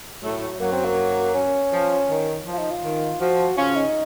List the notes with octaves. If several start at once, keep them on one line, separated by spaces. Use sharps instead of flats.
A2 F#3 A3
F#2 F#3 A#3
C4
A#3
C#4
F3
D#3
F3
F4
D#4
F4
D#3
F3 F#4
C#3 C#4 F4
D#4